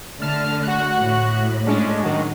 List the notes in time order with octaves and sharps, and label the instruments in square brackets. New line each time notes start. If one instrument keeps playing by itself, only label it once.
[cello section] D3 A3 [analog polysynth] A5 F6
[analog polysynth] F#4 F#6
[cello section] A2
[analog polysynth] G#3 C#4 D4
D#3 F#3 G#3